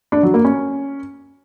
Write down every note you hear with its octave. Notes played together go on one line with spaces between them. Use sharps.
D4
F#3
A#3
C#4